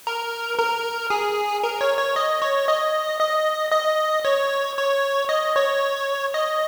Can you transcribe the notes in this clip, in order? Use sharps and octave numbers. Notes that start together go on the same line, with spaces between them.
A#4
A#4
G#4
A#4
C#5
C#5
D#5
C#5
D#5
D#5
D#5
C#5
C#5
D#5
C#5
D#5